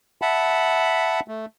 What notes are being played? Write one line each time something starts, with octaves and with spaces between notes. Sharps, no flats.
E5 F#5 A5 B5
A3